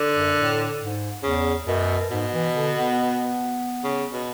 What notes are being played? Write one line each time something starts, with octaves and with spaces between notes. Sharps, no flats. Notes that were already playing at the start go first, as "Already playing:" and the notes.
Already playing: D3
F#2
A2
G#2
E2 C#3
F#2 B2
G#2 B2
E3
D3
B3
C#3
B2